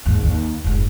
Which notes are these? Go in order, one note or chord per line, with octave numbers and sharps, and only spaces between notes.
D#2 G#2
D#2
F1 G#2